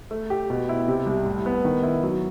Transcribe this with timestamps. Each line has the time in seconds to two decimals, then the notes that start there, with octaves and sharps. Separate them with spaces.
0.11 A3
0.30 G4
0.50 B2
0.69 E4
0.88 C3
1.06 C2
1.26 A2
1.46 B3
1.65 D#3
1.83 E4
2.03 F#3